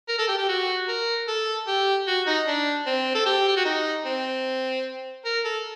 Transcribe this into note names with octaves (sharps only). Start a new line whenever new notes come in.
A#4
A4
G4
G4
F#4
A#4
A4
G4
F#4
D#4
D4
C4
A4
G4
G4
F#4
D#4
C4
A#4
A4